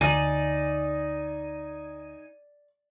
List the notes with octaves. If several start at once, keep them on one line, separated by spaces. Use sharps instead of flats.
D2 D#4 D5 G#5